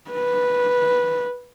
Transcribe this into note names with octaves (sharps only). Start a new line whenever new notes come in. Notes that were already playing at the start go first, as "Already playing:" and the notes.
B4